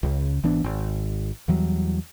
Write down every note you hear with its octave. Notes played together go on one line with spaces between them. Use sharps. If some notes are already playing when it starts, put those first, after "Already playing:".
C#2 C#3
G#1 E3 B3 D4
G#1
E2 E3 F#3 G3